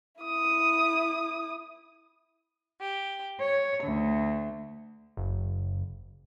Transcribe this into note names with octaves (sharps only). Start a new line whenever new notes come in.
E4 D#6
G4
C#5
D2
F#1